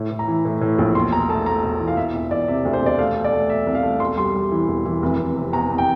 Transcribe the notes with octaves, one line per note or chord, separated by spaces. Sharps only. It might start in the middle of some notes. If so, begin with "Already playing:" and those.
Already playing: A2
A2
A#5
E3
A2
A2
A#1
E1 C6
E2 A#5
A3 A5
A3 A#5
E1
E3
F5
E1 E5
E1 E5
E1 D5
C3 E5
D2
C5
E1 D5
A3 F5
A3
D5
A3
A3 E5
C2
F5
A3
E1 C6
G3 C6
G3
E3
E1
E3
F1
F1
C3
E2 A#5
E2
G5